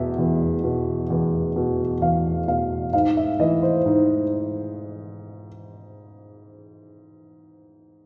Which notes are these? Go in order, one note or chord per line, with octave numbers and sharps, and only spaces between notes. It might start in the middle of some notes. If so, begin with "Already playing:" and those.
Already playing: E2 B2 E5
E2
B2
E2
B2
E2 F5
B2 F5
G#2 F5
E5
E3 D#5
C5
G#2